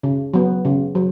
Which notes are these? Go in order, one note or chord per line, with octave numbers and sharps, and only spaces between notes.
C#3
F#3 B3
C#3
F#3